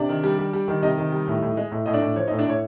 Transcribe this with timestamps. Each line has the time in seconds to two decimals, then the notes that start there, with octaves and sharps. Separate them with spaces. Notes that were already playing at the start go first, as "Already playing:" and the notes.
Already playing: C3 D4 D5
0.09 D#3
0.24 G3
0.38 G3
0.53 G3
0.68 D#3
0.82 C3 D#4 D#5
0.98 D#3
1.12 G3
1.27 A2
1.42 A2
1.57 G#3
1.71 A2
1.86 A2 D#5
1.93 D4 D5
2.02 A2
2.16 F3 C#5
2.27 A2 D#4 D#5
2.39 D4 D5
2.46 A2 C#5